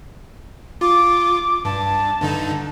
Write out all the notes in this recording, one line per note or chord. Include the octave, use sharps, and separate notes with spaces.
F4 D6
G2 A5
G2 D3 D#4